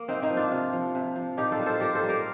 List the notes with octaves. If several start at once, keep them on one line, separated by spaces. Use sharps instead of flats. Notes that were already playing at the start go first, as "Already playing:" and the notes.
Already playing: A#3
C3 C4 D#4
C4 D#4
F3
D4 F4
C3
F3
C3
F3
A#2 D#4 G4
F4 A4
G3
A4 C5
A#2 G4 A#4
A4 C5
G3
G4 A#4